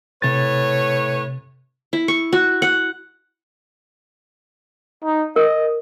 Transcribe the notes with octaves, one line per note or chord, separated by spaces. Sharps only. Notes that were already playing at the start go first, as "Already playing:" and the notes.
A2 C3 B4 C#5 A6
E4
C#6
F#4
F#5
D#4
A#4 D#5